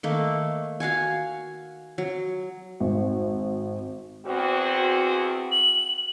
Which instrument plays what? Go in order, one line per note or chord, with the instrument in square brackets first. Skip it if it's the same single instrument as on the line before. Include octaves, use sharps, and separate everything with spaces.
[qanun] D#3 A3 A#3
F#4 F5 F#5 G#5
F#3
[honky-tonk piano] G#1
[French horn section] E2 C4 F#4
[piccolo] F#7